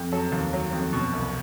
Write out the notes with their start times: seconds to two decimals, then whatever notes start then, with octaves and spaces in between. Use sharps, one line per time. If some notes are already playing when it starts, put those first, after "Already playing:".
Already playing: F2
0.12 F#3 A4
0.32 D#2
0.53 F#3
0.73 F2
0.93 B2
1.13 C2